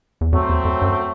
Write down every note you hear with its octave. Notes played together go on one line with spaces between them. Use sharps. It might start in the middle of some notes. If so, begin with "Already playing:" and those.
E2
F2 F#3 A3 C4
E2
F2
F#2